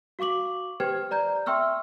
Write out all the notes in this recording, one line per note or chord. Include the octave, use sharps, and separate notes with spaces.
F#4 F5 C#6 D6 F#7
G4 B4 C5 G5 F6 G#6
D5 A#5 G6
E5 G5 C6 C#6 E6 F6